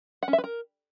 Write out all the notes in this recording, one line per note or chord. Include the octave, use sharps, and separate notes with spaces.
F#5
C#4
E5
B4
A#4